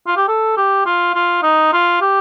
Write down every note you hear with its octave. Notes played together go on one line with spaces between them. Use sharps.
F4
G4
A4
G4
F4
F4
D#4
F4
G4